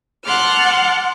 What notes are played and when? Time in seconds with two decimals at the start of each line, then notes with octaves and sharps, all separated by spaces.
0.24 F#5 A5 C6 D6 F6